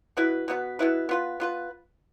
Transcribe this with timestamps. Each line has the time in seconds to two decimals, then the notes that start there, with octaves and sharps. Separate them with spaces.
0.17 B2 B3 E4 B4
0.48 B2 B3 E4 B4
0.79 B2 B3 E4 B4
1.09 B3 F4 B4
1.40 B3 F4 B4